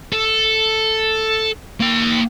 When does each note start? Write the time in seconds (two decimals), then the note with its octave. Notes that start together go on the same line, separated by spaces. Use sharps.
0.12 A4
1.80 A#3 G5